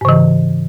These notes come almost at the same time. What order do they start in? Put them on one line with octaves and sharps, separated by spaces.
G#2 C#3 E3